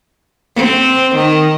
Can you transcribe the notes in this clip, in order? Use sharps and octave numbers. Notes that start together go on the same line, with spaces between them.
C4
D#3